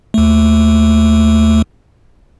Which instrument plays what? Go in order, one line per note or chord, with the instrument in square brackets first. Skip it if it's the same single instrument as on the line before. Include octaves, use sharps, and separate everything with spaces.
[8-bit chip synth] D#2 A3